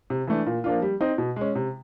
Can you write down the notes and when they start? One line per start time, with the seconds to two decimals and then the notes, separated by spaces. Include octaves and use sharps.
0.10 C3
0.27 E3 A3 D4
0.46 A#2
0.64 F3 A#3 D4 F4
0.82 G3
1.01 C4 D#4
1.18 B2
1.36 G#3 C#4
1.55 C3